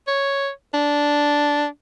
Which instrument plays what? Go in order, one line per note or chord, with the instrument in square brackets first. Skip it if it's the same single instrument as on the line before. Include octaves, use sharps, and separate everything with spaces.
[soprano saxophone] C#5
D4